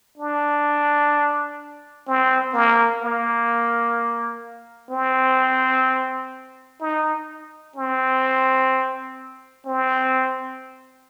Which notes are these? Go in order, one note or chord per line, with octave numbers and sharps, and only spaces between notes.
D4
C4
A#3
A#3
C4
D#4
C4
C4